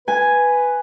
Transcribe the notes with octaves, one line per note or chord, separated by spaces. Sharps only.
B4 G#5